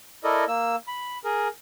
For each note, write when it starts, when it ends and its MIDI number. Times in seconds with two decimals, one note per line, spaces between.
0.24 0.45 64
0.24 0.45 69
0.24 0.45 70
0.24 0.45 74
0.24 0.45 75
0.48 0.76 58
0.48 0.76 88
0.87 1.18 83
1.24 1.48 68
1.24 1.48 70